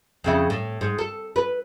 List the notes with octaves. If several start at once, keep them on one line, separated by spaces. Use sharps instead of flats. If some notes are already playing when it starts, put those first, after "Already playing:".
F2 C#3 E4
A2
G#2
A4
B4